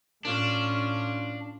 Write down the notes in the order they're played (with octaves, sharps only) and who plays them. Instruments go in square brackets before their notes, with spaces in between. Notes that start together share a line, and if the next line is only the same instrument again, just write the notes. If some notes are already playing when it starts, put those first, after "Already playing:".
[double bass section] A2 [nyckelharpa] C#4 F4 [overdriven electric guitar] D4